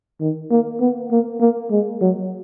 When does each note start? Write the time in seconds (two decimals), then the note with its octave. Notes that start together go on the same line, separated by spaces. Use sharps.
0.20 D#3
0.51 A#3
0.80 B3
1.11 A#3
1.40 A#3
1.71 G#3
2.01 F#3